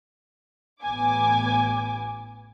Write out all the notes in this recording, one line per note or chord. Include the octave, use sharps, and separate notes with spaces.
A1 B3 G#5 D6